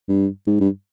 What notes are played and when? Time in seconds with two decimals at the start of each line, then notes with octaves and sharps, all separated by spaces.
0.09 G2
0.47 G#2
0.60 G2